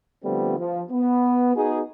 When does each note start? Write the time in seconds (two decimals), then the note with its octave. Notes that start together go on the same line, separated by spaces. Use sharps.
0.24 D3 F3 G3 A3 B3 C4
0.59 F3
0.91 B3
1.56 B3 D#4 F#4 G#4